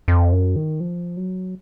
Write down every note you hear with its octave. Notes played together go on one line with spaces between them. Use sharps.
F2
F#2
D#3
F3
F#3